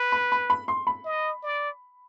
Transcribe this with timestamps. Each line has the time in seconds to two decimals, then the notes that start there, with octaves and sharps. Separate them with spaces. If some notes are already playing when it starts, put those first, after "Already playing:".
Already playing: B4
0.12 B5
0.32 B5
0.50 B5
0.68 C6
0.87 B5
1.05 D#5
1.43 D5